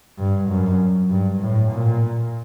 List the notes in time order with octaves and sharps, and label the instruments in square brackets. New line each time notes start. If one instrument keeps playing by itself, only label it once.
[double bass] G2
F#2
G2
A2
A#2